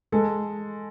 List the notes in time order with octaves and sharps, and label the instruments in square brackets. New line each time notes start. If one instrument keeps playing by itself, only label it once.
[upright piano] G#3 A4